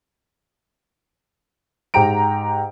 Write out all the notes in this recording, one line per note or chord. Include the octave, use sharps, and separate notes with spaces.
G#2 G4 G5 A#5 D7